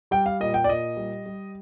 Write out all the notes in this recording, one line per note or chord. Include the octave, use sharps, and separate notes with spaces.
G3 G5
F5
A#2 D#5
G5
D5
A#2 D#5
G3
G3